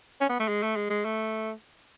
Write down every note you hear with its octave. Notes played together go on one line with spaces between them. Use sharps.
C#4
B3
A3
G#3
A3
G#3
G#3
A3